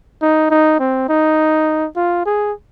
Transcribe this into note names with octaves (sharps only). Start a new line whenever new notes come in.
D#4
D#4
C4
D#4
F4
G#4